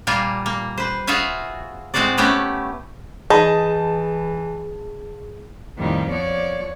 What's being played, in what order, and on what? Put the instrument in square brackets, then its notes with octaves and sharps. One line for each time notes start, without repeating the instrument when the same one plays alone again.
[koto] A#2 G3 A#3 F4 G#5
A#3
B4 C5
F4 F#4 G#4 E5 F5 G#5
A2 G#3 C4 F#4 C5 D5
A3 B3 C#4 G4 B4
[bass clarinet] E3 [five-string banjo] D#4 [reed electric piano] G#4 B5 [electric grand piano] A5
[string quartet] F2 A2 D#3 G3 D#4
F3 B3 C#5 D5